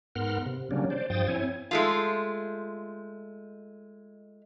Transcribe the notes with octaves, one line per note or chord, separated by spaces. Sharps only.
G#2 B3 A#4 F#5 C6 F6
C3
C#3 F#3 G3 A#3 C#4 D4
C5 D5
G2 F3 C5 G5 D#6 A6
C4 E4 C#5 G#5
G#3 A3 F4